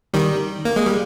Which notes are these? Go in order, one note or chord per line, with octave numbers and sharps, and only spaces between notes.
D#3 G3
A#3
G#3
G3